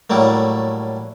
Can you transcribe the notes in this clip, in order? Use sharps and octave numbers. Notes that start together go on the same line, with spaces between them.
A2 F#3 G3 A3 A#3